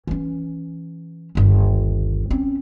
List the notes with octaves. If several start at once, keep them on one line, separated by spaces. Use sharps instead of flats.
E3 C#4
G1 D#2
C4 C#4